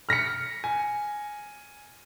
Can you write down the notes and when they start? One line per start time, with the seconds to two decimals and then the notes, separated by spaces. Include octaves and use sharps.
0.09 F6 A#6 B6 C#7
0.64 G#5